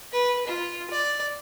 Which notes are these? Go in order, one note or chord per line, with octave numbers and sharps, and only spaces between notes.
B4
F4
D5